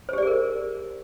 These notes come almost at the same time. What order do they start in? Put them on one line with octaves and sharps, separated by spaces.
C5 G4 D5 G#4 A#4